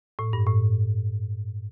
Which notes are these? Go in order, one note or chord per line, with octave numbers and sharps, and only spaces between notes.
A2
G2
A2